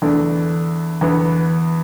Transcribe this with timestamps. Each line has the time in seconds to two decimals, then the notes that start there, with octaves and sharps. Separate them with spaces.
0.02 E2 D3 A3 D4
1.01 E2 D3 B3